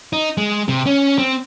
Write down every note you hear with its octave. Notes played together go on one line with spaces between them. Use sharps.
D#4
G#3
C3
C#4
C4